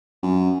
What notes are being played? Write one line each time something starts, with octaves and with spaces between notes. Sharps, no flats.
F#2